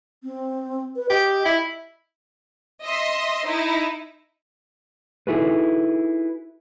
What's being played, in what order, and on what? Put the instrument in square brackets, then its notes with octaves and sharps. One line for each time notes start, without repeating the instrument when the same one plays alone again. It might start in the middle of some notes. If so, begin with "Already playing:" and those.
[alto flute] C4
B4
[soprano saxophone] G4 [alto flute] D#5
[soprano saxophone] E4
[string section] D#5 E5 C6
D#4 E4
[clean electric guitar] D#4 E4 F#4 G#4 A4 B4